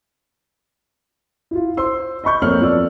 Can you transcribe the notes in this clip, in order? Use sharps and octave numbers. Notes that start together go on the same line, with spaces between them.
E4 F4
C5 C6 E6
D#5 B5 C#6 G6
F2 A#3 C4 C#5 F6 F#7
F2 F3 B3 A4 D5 E6